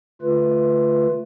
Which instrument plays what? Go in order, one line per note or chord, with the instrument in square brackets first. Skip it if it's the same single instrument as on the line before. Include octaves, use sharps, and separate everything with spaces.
[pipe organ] D3 A3 F4 B4